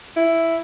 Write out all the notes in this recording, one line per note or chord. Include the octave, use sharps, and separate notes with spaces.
E4